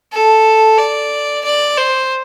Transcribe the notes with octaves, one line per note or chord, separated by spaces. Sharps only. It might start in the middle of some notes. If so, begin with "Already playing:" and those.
A4
D5
D5
C5